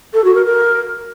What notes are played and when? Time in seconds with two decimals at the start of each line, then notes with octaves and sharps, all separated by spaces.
0.14 A4
0.24 F#4
0.35 A#4
0.46 A#4